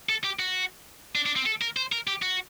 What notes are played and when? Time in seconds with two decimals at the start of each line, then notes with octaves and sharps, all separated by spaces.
0.09 A4
0.24 G4
0.39 F#4
1.15 D4
1.26 D4
1.36 C4
1.46 A4
1.61 A#4
1.77 C5
1.92 A#4
2.07 G4
2.22 F#4